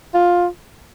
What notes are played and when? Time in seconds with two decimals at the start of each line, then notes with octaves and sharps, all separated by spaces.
0.14 F4